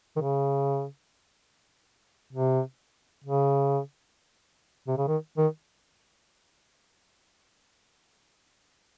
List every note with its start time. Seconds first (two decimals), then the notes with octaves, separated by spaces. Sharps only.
0.16 D#3
0.21 C#3
2.33 C3
3.24 C#3
4.88 C3
4.97 C#3
5.08 D#3
5.38 D#3